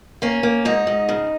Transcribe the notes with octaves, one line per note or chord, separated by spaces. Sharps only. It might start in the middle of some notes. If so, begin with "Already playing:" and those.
A#3 C#4
A#3
G#2 D#4
G#2
C#3